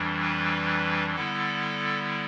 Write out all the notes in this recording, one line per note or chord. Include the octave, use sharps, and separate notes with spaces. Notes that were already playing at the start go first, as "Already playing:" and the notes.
Already playing: F2 E3 G3 D4
B4
D3 G3 B3 E4 A4